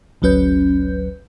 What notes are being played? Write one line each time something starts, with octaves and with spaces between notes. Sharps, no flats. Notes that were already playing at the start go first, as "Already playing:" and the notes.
G#1 D2 F#3 C#4 B4 G6